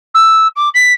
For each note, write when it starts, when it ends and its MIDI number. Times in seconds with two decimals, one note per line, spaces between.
0.14 0.47 88
0.56 0.69 86
0.74 0.93 95